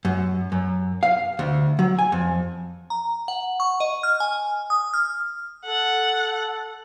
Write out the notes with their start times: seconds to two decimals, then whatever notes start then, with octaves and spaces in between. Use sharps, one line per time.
0.05 F#2
0.52 F#2
1.03 F5
1.39 D2
1.79 F#3
1.99 G#5
2.12 F2
2.90 A#5
3.28 F#5
3.60 C#6
3.80 D#5
4.03 F6
4.20 G#5
4.70 D#6
4.94 F6
5.66 A4 F#5